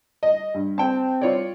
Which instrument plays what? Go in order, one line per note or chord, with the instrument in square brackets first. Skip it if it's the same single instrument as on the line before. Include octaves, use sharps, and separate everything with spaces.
[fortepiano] D#5
G2
[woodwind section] C4 [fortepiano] G5 A5
[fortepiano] F4 C#5 D5